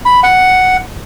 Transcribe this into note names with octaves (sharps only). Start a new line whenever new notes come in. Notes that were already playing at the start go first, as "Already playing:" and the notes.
B5
F#5